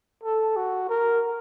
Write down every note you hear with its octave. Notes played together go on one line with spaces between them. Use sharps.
A4
F#4
A#4